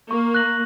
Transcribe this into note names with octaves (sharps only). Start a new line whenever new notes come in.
A#3 C#6
F#6 A#6 F#7